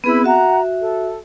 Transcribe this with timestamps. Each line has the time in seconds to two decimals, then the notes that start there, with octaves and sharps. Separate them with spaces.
0.04 B3 C4 E4 G#4 B4 B5
0.24 F#4 E5 F#5 A#5
0.81 A4